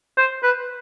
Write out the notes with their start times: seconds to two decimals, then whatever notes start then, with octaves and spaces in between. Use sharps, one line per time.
0.17 C5
0.43 B4